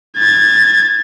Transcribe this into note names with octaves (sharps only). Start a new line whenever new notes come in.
G#6 A6